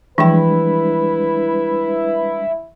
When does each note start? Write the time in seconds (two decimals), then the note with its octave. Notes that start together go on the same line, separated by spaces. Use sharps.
0.18 E3 F3 G3 G#3 D4 E4 B4 G5